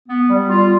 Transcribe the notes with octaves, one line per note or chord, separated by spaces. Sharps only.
B3
G3
F4